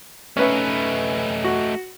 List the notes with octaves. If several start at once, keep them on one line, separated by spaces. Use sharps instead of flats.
A3 C#4 D#4 B4 E5
F#4